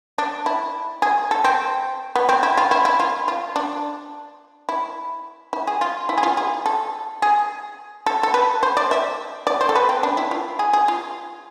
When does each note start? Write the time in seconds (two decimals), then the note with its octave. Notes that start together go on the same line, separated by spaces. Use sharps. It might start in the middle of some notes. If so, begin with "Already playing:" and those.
0.18 D4
0.46 E4
1.02 G#4
1.31 A4
1.44 C4
2.16 B3
2.29 C4
2.43 E4
2.58 F4
2.71 E4
2.85 E4
3.00 F4
3.28 F4
3.56 D4
4.69 E4
5.53 E4
5.67 G#4
5.81 F4
6.09 E4
6.18 G#4
6.23 F4
6.37 G#4
6.66 A4
7.22 G#4
8.06 A4
8.23 A4
8.34 B4
8.63 C5
8.77 D5
8.91 E5
9.47 D5
9.61 C5
9.69 A4
9.75 B4
9.89 C4
10.03 D4
10.17 E4
10.31 F4
10.59 G#4
10.73 G#4
10.88 F4